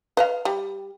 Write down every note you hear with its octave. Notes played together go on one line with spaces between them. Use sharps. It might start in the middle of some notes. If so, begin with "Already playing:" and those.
B4 D#5 F5
G3